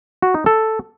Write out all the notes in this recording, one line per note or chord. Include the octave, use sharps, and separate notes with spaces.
F#4
D#4
A4